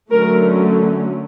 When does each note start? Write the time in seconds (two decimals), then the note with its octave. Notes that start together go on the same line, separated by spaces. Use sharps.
0.11 D3 F#3 A3 C#4 A#4